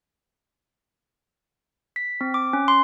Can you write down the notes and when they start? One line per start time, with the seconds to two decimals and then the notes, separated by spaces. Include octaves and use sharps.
1.96 B6
2.21 C4
2.34 D6
2.53 C#4
2.68 C6